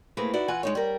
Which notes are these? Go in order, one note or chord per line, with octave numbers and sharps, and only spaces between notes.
A3 A#3 C4 E4 G#4 B4
D#4 E4 F#4 D5
E3 F4 F#5 G#5
G#3 D#4 C#5
G3 A#4